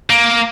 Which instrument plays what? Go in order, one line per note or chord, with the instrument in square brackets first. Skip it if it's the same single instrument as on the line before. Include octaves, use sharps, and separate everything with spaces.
[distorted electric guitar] A#3